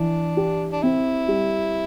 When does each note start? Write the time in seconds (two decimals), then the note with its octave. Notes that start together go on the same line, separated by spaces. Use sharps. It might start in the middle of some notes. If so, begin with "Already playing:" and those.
Already playing: E3 D4
0.37 G4
0.72 D4
0.82 C4 E4
1.28 G3